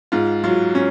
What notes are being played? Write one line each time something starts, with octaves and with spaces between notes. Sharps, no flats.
G#2 F4
F#3 F4
C#4